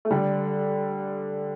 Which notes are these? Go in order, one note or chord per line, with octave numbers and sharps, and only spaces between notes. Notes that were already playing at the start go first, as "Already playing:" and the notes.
A3
D3 G3